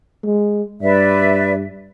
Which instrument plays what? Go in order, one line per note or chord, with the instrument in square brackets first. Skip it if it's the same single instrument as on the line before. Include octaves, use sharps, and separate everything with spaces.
[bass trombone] G#3
[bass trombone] G2 [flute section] B4 D5 E5